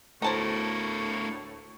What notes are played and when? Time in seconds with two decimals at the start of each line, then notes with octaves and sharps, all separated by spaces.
0.22 D2 A2 A3 A#4 C5 A5 A#5 C#6